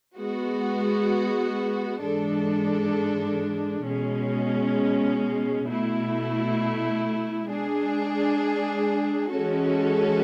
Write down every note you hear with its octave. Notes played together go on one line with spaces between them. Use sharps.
G#3 B3 F#4
G#2 E3 G#3 D4 A4
B2 G#3 C#4
B2 A3 E4
G#3 D4 G#4
E3 G#3 C#4 F#4 A4